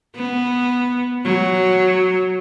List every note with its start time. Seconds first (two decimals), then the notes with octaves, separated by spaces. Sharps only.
0.16 B3
1.24 F#3